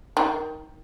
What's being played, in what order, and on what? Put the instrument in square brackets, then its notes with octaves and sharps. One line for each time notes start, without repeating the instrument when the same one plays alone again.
[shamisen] D#3